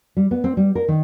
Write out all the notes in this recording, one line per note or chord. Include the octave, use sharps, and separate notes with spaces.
G3
B3
C4
G3
A#4
D#3